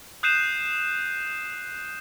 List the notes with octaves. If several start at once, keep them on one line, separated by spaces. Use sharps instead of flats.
D#6 F#6 G6 C7 D#7 E7